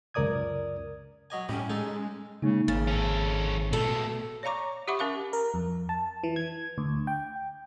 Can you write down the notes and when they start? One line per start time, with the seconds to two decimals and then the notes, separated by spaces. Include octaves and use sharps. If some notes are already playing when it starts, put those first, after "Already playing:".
0.14 C#2 F#2 A#4 D5 D#6 G#6
1.30 F#3 D#5 G#5
1.49 A2 G3 C#4
1.70 G#3 D#4 G#4 A4
2.42 C#3 G#3 A#3 D#4
2.68 G#1 C#3 A6
2.88 C#4 A4
3.73 B2 A3 A4
4.43 C#5 D5 F5 A#5 C#6 D6
4.88 G4 E5 F#5 B5 C#6 D6
4.99 C#4 A#4 F5 D6
5.33 A#4
5.54 F2
5.89 A5
6.24 E3
6.36 G#6
6.78 D2
7.07 G5